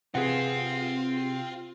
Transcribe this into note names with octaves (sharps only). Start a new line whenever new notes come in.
C3 C4 F4 G#4 B4 F#5